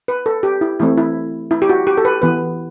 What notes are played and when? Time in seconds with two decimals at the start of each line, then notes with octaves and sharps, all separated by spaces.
0.08 B4
0.26 A4
0.43 G4
0.61 E4
0.80 E3 A3 C4 E4
0.98 E4
1.51 E4
1.62 G4
1.69 F#4
1.87 G4
1.97 A4
2.05 B4
2.22 E3 B3 B4